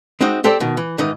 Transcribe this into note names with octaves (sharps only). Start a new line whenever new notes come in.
G#3 C4 D#4 F#4 D#5
C4 G4 A4 C5 D5
B2 D#3
E3
G#2 D#3 E3 D#4 D#5